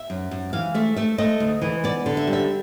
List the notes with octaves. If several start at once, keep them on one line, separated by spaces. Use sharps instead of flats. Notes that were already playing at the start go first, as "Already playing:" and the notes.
Already playing: E5
F#2
F#2
E3 F5
A3 E5
A3 E5
A3 D#5
D2
E3
B3 D5
D3
E5
G3
E5